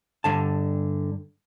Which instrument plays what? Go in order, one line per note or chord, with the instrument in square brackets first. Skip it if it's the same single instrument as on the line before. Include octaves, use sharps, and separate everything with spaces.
[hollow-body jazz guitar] G2 D3 A5